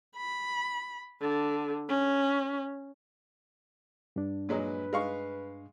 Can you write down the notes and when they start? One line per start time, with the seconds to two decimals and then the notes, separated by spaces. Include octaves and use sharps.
0.16 B5
1.21 D3
1.89 C#4
4.16 G2 D4
4.49 A#2 F#3 G#3 B4
4.93 G#3 F5 C#6